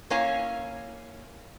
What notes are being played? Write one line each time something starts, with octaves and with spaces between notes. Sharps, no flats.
A#3 C#4 E4 C#5 F5 G#5